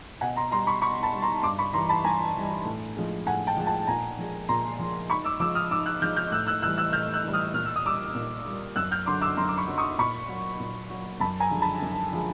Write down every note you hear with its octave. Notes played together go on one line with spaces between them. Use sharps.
B2 F#5 G#5
A#5 C6
G3 A#5 C6
B5 C#6
B2 B5 C#6
A5 B5
G3
A#5 C6
G2 C6 D6
B5 C#6
E3 G3 A#5 C6
A5 B5
G2 G#5 A#5
E3 G3
A2
F3 G#3
A2 F#5 G#5
G5 A5
F3 G#3
G5 A5
A#2 G#5 A#5
F3 G#3
A#2 A#5 C6
F3 G#3
G#2 B5 C#6
D6 E6
F3 G#3 D6 E6
D#6 F6
G#2 D6 E6
E6 F#6
F3 G#3 F6 G6
F6 G6
A2 E6 F#6
E6 F#6
E3 G3 E6 F#6
E6 F#6
A2 F6 G6
E6 F#6
E3 G3
D#6 F6
A#2 F6
E6
D#6
G3 D6 E6
A#2
G3
F#2 E6 F#6
F6 G6
D3 F#3 C6 D6
D6 E6
F#2 A#5 C6
D6
B5 C#6
D3 F#3
C#6 D#6
A#2 B5 C#6
F#3
A#2
F#3
F#2 A5 B5
G#5 A#5
D3 F3 G#3
A5 B5
F#2
D3 F3 G#3